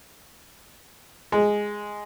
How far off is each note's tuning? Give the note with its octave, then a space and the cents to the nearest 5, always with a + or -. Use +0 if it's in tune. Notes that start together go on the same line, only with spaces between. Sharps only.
G#3 +0 D#5 +0